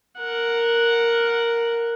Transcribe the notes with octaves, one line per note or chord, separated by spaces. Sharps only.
A#4 F#5